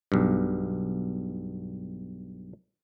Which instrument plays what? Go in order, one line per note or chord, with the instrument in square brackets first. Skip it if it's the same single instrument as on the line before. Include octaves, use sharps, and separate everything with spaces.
[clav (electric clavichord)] B1 G2